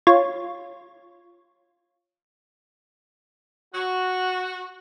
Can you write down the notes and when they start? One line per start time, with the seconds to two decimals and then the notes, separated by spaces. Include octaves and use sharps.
0.07 F4 C#5
3.75 F#4